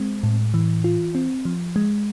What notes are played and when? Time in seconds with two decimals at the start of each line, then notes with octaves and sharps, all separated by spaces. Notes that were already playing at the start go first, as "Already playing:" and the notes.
Already playing: G#3 C4
0.23 A2
0.54 E3
0.84 F4
1.15 C4
1.45 F3
1.76 G#3